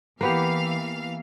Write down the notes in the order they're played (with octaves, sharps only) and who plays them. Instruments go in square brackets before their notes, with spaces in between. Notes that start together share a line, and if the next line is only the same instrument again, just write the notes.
[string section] E3 F5 [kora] A#3 B3 G4